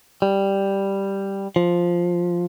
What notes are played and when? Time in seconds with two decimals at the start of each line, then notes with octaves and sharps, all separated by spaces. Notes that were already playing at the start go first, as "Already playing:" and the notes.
0.22 G3
1.56 F3